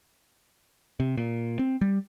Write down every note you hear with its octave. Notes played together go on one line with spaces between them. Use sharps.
C3
A#2
C4
G3